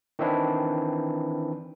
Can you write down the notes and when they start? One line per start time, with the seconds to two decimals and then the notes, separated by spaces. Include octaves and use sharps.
0.19 D#3 E3 C4 D4 E4